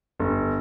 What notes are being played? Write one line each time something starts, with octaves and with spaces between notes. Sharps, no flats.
G1